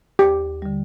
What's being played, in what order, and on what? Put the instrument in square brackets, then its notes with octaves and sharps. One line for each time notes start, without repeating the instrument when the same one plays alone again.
[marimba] D#2 [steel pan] G4
[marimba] D3 G3